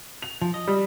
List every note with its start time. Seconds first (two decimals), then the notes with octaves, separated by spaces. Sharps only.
0.22 F7
0.42 F3
0.54 D#5
0.67 G3